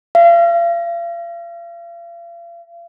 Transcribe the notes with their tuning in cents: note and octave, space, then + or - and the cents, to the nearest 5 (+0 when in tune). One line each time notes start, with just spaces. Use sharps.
F5 -40